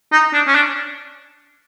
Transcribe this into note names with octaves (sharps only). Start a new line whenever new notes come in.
D#4
D4
C#4
D4